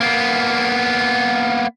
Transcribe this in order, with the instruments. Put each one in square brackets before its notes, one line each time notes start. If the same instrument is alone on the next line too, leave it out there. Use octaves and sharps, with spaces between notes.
[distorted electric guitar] A#3 B3